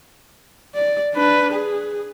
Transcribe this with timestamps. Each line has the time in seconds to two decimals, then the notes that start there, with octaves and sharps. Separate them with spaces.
0.75 D5
1.14 D4 B4
1.53 G#4